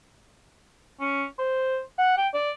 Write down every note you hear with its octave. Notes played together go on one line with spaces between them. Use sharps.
C#4
C5
F#5
G5
D5